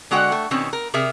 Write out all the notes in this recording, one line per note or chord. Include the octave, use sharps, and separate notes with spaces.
D3 G#3 F#4 F#5 G5
A3
B2 D#3 C4 C#4
A#4
C3 G#4 A#4 E5